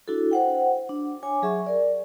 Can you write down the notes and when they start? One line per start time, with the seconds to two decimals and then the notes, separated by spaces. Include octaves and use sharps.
0.08 D4 E4 F#4 A4
0.31 C5 F#5 G5
0.89 D4
1.23 C#5 G#5 D6
1.42 F#3 G#4 E5 C#6
1.66 A#4 D5